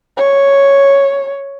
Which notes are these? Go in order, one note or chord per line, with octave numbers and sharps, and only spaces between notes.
C#5